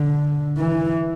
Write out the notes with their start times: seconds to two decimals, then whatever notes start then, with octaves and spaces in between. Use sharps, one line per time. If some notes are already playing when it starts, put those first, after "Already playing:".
Already playing: D3
0.58 E3